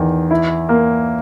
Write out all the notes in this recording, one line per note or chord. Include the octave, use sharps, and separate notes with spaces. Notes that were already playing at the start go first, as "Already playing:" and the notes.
Already playing: E2 D#3
E4
A#3